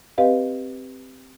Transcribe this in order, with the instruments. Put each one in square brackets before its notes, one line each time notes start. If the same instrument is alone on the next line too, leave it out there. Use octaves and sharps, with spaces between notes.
[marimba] C4 G4 B4 D#5 F5